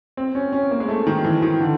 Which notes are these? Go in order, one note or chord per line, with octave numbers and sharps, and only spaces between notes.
C4
C#4
C#4
A#3
G#3
A3
D#3
E3
D#3
D3